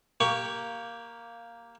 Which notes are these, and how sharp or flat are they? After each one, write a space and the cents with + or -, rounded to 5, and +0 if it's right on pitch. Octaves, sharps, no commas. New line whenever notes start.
A#3 +0 G4 +0 C#6 +15